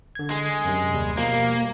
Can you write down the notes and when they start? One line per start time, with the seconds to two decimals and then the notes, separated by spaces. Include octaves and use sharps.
0.15 D3 G#6
0.31 G#3
0.65 F#2 C3
0.93 D#2 G3
1.17 B2 F3 G3 A#3